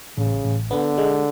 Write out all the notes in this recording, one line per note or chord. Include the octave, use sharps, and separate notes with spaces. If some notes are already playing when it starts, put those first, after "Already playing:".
A1 C#3
A1
D3 B3
G#3